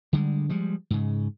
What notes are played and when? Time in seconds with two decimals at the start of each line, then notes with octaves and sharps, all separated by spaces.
0.13 D3 G3 G#3
0.49 F3 G3 G#3
0.90 G#2 C#3